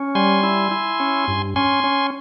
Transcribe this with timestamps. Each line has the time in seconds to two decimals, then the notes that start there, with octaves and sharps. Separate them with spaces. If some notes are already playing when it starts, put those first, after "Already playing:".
Already playing: C#4
0.15 G3 G#5 C6
0.43 E4
0.71 E4
1.00 C#4
1.28 G2
1.56 C#4 G#5 C6
1.84 C#4